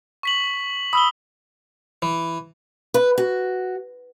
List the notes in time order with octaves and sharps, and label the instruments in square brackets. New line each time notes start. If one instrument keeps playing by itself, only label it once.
[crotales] C#6 B6 F#7
[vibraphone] B5 [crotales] D#6 E6 G7
[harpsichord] E3
[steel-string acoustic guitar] B4
F#4